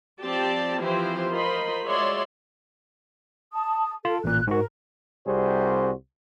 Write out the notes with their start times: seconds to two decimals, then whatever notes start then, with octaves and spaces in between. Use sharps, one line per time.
0.23 F3 C4 G4 D5 A5
0.80 E3 F3 C4 E4 G4 C5
1.31 F4 A#4 C5 D#5 B5 C6
1.86 G#3 F#4 C#5 D5 E5 C6
3.53 A5 D#6
4.05 F4 A4
4.24 A1 A#2 F#6
4.47 G#2 F#4 A#4
5.27 C2 C3 G3 F#4 G#4 C5